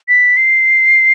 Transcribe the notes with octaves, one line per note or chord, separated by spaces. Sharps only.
B6
C7